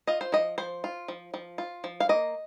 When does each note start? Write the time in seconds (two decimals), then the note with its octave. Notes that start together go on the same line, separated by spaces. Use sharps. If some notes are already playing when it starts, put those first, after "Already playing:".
0.07 F4 D#5
0.21 C5
0.32 F3 D#5
0.58 F3 C5
0.84 F4
1.08 F3
1.34 F3
1.58 F4
1.84 F3
2.00 F5
2.09 A#3 D#5